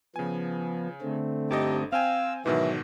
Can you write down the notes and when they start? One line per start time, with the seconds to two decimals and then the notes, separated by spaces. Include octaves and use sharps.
0.16 C#3 F3 B3 G#5
1.02 D3 A3 C4
1.50 G1 D#4 G4 A4 D#5
1.92 C4 F5 G5 G#5 E6
2.46 G#2 B2 D#3 E3 F#3 F#4